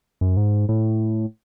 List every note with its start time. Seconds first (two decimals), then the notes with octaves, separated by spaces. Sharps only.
0.21 F#2
0.37 G#2
0.69 A2